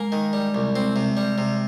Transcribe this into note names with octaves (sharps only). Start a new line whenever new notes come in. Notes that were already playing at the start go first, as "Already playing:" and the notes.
Already playing: G#3 A#3
D#3
G3
C2
G#3 C4
C3
G3
C3